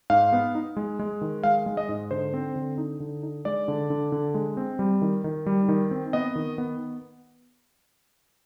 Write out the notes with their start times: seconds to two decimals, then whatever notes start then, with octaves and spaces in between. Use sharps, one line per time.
0.10 G#2 F5
0.33 B3
0.55 D#4
0.77 G#3
0.99 G#3
1.21 D#3
1.44 G#3 F5
1.66 G#3
1.77 D#5
1.89 G#2
2.11 D3 C5
2.34 C4
2.56 D3
2.78 D#4
3.00 D3
3.23 D#4
3.45 G#3 D5
3.68 D3
3.90 D3
4.12 D3
4.34 G#3
4.57 C4
4.79 G3
5.02 D#3
5.24 D#3
5.46 G3
5.69 D#3
5.91 C4
6.13 B3 D#5
6.35 D#3
6.58 B3